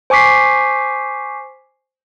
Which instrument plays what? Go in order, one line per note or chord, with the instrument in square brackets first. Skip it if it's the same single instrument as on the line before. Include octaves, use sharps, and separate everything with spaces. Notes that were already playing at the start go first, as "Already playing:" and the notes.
[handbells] C5 G#5 C#6 D6 B6 C7